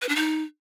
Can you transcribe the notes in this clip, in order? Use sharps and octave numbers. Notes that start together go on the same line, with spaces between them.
B4
D4
D#4